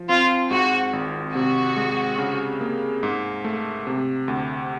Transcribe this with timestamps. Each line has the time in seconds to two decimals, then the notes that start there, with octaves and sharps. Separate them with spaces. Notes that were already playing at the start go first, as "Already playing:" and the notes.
Already playing: F3
0.09 C4 F4
0.51 G#2 F#4
0.93 G#1
1.35 C3 F#4
1.77 G#3
2.18 C#3
2.61 A#3
3.03 G#2
3.44 A3
3.87 C3
4.28 D2